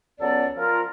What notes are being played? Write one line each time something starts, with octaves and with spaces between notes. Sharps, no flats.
C#2 F#3 B3 C#4 A4 D5
F3 F4 A#4